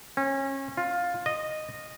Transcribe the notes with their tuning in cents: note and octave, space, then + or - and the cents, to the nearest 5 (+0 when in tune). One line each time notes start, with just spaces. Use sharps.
C#4 -30
F4 +15
D#5 -10